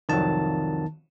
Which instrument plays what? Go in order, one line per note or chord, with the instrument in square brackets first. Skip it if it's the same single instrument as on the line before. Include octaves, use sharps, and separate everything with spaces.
[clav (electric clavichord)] C2 F2 F#3 [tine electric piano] D#3 A5